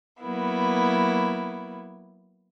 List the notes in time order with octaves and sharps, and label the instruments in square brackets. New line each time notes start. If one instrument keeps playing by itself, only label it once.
[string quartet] F#3 A#3 B3 E4